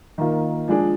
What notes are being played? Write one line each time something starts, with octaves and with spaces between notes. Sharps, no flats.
D#3 A#3 F4
F3 G#3 D4 G#4